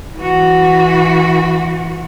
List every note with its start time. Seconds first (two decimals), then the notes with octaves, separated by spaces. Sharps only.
0.16 E3 F#4